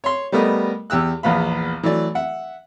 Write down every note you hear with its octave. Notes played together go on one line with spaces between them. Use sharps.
C#5 C6
G3 A3 B3 A#4 D#5
E2 G4 E6 F#6
A#1 E2 B3 F5 B5
E3 F#3 A3 D5
E5 F#5